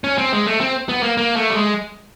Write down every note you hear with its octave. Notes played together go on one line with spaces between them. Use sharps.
C#4
C4
G#3
A3
C4
B3
A#3
A#3
A3
G3
G#3